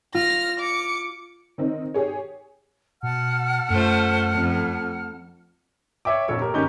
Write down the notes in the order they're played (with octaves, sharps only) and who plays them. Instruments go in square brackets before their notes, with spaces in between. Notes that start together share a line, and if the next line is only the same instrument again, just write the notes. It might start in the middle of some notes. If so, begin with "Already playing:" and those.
[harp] F4 [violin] F6 A#6
[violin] D6 C#7
[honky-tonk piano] D#3 C4 D#4
G4 G#4 C#5
[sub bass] B2 [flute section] F#5 A5 F6
[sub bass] F#2 [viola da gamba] A3 F4 C5
[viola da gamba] F2
[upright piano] C#5 D5 E5 G5 D6
A#1 F2 A4 C#5
A#3 G4 A#4
G#2 D#3 C#4 D#4 G4 G6